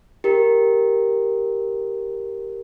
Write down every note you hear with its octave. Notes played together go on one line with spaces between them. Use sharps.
G4 A#4